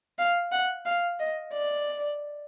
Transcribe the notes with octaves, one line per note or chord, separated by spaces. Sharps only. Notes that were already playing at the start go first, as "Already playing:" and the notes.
F5
F#5
F5
D#5
D5